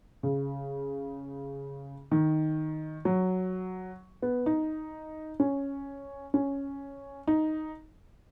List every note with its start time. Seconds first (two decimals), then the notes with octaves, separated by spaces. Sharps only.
0.23 C#3
2.11 D#3
3.05 F#3
4.22 B3
4.46 D#4
5.40 C#4
6.34 C#4
7.27 D#4